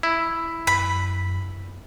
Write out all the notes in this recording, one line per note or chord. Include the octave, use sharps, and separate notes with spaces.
E4
F#2 B5